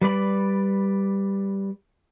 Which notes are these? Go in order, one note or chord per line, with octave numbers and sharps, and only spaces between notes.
G3 B4 D5 B5